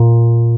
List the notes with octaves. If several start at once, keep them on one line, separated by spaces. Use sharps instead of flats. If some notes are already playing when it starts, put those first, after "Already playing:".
Already playing: A#2